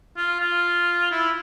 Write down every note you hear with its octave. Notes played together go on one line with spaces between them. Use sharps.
F4
F4
E4